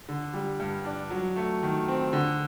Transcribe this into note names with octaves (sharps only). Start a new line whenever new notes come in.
D3
G3
G2
D4
F#3
A3
D#3
C4
D3